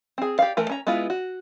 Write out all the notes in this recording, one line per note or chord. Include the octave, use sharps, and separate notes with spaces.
C4 G#4
G4 D5 F5
E3 A3 A#4
C#4 A#5
G#3 B3 E4 F4
F#4